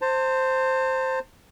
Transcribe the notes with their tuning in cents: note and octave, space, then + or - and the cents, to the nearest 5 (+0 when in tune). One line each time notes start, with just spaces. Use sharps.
C5 +0 A5 +40